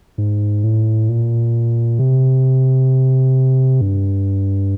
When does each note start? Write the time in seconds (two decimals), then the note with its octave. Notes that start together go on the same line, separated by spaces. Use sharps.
0.18 G#2
0.64 A2
1.09 A#2
1.99 C3
3.81 G2